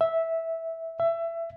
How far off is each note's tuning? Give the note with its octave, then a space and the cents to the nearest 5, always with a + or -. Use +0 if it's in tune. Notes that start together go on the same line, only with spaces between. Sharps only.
E5 -10
E5 +20